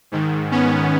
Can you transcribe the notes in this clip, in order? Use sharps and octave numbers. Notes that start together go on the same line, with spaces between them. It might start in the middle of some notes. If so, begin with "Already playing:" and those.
G#2 D#3
B3 C#4